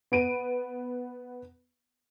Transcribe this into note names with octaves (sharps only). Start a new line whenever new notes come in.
B3 D7 D#7